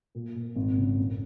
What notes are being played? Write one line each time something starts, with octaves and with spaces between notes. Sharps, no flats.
A#2
A#2
G#1
C#3
F2